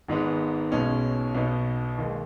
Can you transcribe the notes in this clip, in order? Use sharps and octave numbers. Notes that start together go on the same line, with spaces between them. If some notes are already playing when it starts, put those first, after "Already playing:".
G#1 G#2 G#3 B3
B1 B2 G#3 C#4
B1 B2 B3 D#4
D#2 D#3 G#3